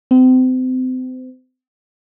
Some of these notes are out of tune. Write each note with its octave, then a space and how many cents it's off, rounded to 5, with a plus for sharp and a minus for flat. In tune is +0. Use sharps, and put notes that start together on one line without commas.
C4 -35